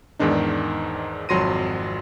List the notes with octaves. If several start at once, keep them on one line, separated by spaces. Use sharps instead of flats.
E2 G#2 D#3 D4 D#4
G#1 F2 F#3 C6 A#6 D#7